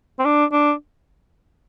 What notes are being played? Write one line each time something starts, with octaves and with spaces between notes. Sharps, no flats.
C4
D4
D4